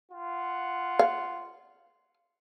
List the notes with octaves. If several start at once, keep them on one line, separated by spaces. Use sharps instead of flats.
F4 F#5
F5